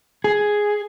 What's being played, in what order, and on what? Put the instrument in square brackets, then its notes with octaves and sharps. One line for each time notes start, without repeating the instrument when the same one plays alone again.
[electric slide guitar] G#4